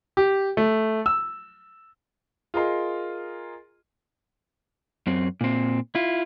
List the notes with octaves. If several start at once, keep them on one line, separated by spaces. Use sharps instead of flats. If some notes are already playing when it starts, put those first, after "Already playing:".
G4
A3
E6
F4 G#4 A#4 D#5 C6
F#2 C4
A#2 C4
E4 F4